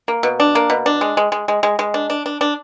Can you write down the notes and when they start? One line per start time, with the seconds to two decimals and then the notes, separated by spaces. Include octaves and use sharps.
0.08 A#3
0.23 B2
0.40 D4
0.55 A#3
0.70 B2
0.86 D4
1.01 G#3
1.17 G#3
1.32 G#3
1.48 G#3
1.63 G#3
1.79 G#3
1.94 D4
2.10 D4
2.26 D4
2.41 D4